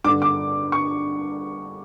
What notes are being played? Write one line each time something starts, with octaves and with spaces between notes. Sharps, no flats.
G2 D3 D6
D6
C#6